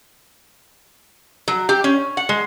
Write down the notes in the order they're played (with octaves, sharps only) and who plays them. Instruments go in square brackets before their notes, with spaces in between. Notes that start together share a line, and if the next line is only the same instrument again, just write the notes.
[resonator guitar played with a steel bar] F#3
G4
C#4
F#5
G#3